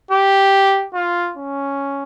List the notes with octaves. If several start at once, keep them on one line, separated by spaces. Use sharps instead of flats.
G4
F4
C#4